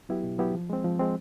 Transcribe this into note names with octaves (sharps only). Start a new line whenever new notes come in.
F#3 B3 E4 G4
B2
F#3 B3 E4 G4
F3
G#3 C4
F3
G#3 C4